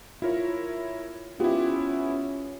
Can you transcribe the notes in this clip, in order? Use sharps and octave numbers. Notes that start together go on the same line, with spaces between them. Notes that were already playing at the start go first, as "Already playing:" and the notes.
E4 F4 A#4 C#5
B3 C#4 E4 F4 G4